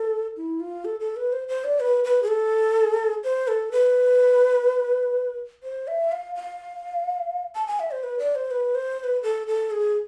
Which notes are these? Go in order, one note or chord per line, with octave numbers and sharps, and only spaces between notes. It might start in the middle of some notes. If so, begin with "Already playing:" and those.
Already playing: A4
E4
F4
A4
A4
B4
C5
C5
D5
B4
B4
G#4
A4
C5
A4
B4
C5
E5
F5
F5
A5
G#5
E5
C5
B4
D5
C5
B4
C5
C5
B4
A4
A4
G#4